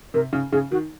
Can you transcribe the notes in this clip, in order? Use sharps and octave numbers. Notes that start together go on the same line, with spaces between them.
C3 A#4
C#3
C#3 G#4
D#3 F#4